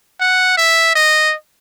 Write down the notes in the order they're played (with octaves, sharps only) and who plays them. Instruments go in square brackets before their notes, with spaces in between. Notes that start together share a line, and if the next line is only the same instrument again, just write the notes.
[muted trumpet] F#5
E5
D#5